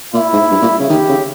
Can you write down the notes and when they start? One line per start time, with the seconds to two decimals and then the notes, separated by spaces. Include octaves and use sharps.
0.14 A#2 E4
0.33 G#2
0.51 G2
0.62 A#2
0.80 C#3
0.90 D#3 G4
1.09 C#3